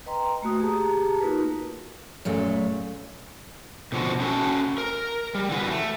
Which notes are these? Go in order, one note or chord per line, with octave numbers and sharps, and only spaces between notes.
B4 D#5 G5 A#5 C6
A3 A#3 F#4 D#6
G4 G#4 A5 A#5
A#3 D#4 F4 F#4 A#4 B4
F#2 A#2 G#3 A3
B2 D3 F3 F#4
C#4 F#4 A4 E5 A5
A#4
G3
D3 E3 F#4 B4
A3